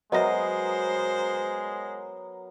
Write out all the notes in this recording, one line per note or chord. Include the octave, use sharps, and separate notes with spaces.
F#3 G#3 B3 A#4 C5 D#5 E5